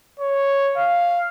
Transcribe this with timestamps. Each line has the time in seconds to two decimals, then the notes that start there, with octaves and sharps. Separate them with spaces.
0.20 C#5
0.76 F5